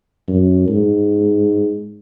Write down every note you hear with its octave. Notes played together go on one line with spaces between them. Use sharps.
F#2
G#2